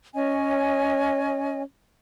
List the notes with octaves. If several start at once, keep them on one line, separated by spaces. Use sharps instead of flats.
C#4 C#5 D#5 G#5